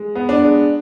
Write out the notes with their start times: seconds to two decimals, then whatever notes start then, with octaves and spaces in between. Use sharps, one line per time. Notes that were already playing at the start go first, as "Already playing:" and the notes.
Already playing: G#3
0.15 B3
0.29 D4
0.42 G#3